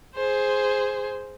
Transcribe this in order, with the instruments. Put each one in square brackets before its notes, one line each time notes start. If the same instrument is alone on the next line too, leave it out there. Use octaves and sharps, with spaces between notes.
[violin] G#4 C5